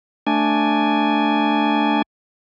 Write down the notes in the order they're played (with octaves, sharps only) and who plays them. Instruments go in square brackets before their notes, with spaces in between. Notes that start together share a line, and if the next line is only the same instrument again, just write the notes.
[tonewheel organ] A3 D4 G#5